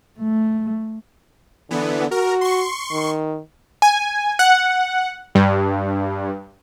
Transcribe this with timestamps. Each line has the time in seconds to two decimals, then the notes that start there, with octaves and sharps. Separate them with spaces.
0.19 A3
1.71 D3 E3 B3
2.11 F#4 A#4
2.41 C6 C#6
2.92 D#3
3.82 G#5
4.39 F#5
5.35 G2